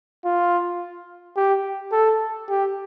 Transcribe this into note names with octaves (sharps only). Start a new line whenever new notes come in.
F4
G4
A4
G4